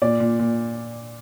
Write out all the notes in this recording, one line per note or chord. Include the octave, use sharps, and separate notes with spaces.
A#2 D5
A#2
A#2